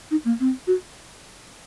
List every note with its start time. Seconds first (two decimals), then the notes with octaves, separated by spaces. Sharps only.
0.11 D#4
0.25 A#3
0.40 C4
0.67 F#4